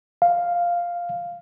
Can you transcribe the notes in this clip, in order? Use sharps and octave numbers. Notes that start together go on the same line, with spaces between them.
F5